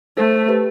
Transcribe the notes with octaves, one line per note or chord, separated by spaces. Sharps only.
A3 A4 C5
G4 B4